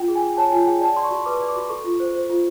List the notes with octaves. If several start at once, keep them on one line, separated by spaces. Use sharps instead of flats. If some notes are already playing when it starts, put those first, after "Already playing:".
Already playing: F4 G5
G#4
G#5
G#4
C#5 A5
F4 G#5
G#4 G5
D5 A5
D5 C6
C#6
F#4
B4 D6
D5
D6
F#4
A4 C#6
F4
C5
C5
F4